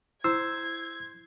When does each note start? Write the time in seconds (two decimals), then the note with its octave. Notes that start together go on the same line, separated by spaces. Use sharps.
0.24 E4 C5 E6 G#6